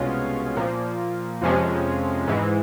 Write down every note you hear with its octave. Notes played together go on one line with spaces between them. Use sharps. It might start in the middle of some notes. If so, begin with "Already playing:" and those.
Already playing: C2 B2 G#3 C#4 F4
A#2 F3 A#3
F2 C3 F3 G#3 C#4
G#2 E3 G#3